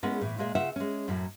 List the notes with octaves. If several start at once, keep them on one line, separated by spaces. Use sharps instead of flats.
G#3 B3 C#4 E4 G#4 A#4
A2 E3
A#2 G#3 G#4 E5
C#3 F4 E5 F#5
G#3 C#4
F#2 A2 F#3